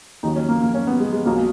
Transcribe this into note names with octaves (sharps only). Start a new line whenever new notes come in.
D#2 D#3 F#3 D#4
C#4
A#3
A#3
C#4
B3
G#3
G#3
B1 B2 F#3 A#3